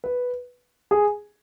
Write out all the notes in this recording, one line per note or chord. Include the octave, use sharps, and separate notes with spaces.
B4
G#4